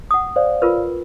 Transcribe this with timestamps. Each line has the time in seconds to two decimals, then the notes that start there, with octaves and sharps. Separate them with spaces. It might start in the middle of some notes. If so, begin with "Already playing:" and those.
0.11 F#5 D#6
0.36 C5 D5 F5
0.62 F4 A#4 B4